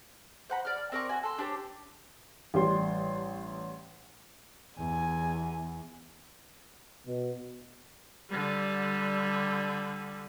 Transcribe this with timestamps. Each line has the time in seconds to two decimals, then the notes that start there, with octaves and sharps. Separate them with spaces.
0.50 C5 F#5 A#5 B5
0.65 D5 F6
0.92 C4 A#4 D5 C#6
1.09 F#4 G#5
1.23 A4 C6
1.38 D4 G4 C5 C#5
2.54 A1 G3 C6
4.78 E2 G#5
7.06 B2
8.29 D3 G3